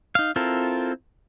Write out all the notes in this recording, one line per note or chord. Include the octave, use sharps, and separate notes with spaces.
D#4 F5
C4 E4 F4 A4 A#4